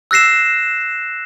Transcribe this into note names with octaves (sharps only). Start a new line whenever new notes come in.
E6 F#6 A#6 C7 E7